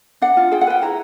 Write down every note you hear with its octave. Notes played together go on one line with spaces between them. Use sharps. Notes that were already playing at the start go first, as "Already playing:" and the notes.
D4 F#5
F4
G#4 G5
F#5
B4 G5
E4 A#5